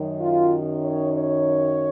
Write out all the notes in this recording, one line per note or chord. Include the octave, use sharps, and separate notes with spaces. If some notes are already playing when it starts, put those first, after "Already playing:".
Already playing: F#2 D#3
F4
C#5
C#5